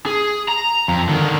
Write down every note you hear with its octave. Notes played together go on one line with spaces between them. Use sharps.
G#4
A#5
F2
D3 D#3